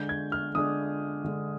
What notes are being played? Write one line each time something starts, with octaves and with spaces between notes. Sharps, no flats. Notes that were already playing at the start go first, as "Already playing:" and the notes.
Already playing: D3 G#3 D4 G6
G#6
F6
D3 G#3 D4 D#6
D3 G#3 D4